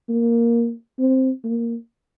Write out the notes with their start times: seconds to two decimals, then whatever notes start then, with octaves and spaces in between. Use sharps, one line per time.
0.09 A#3
0.99 C4
1.44 A#3